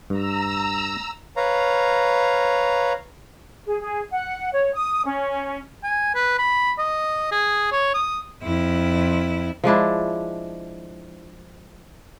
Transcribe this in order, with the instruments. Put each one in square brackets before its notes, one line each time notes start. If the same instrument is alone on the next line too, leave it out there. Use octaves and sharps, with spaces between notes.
[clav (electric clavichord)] G2 [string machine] A#5 E6
[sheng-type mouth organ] B4 C#5 F5 A#5
[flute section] G#4
G#4
F#5
C#5
D#6
C#4
[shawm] G#5
B4
B5
D#5
G#4
C#5
D#6
[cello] F2 E4
[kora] F3 G#3 D4 E4